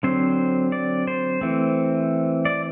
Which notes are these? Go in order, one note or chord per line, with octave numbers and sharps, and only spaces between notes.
D3 F#3 C4 C5
D5
C5
E3 A3 C4
D5